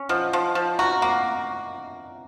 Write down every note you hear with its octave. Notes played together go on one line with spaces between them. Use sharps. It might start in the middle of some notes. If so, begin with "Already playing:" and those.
Already playing: C#4
F3 D#5 F#5
F3
F3
F#4 F#5 A#5
A#3 F#5 A#5